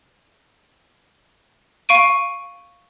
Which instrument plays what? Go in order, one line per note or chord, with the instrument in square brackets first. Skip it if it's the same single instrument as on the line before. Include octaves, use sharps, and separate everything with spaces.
[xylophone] F5 C#6 D7 D#7